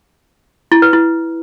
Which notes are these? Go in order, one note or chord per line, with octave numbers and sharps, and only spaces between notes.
E4
B4
E4